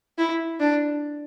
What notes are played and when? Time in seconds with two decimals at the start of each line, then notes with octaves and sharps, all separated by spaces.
0.18 E4
0.60 D4